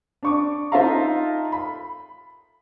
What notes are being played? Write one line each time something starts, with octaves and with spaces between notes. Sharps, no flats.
D4 C#6 D6
D#4 F4 A4 E5 F5 A#5
B5